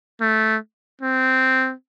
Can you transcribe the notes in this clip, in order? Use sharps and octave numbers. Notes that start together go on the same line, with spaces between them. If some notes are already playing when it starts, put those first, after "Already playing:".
A3
C4